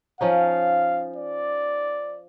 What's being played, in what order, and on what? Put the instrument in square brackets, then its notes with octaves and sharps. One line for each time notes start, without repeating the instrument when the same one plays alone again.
[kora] F3 C#4 D#4 [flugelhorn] F5
[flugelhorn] D5